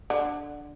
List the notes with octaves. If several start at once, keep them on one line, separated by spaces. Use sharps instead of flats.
D3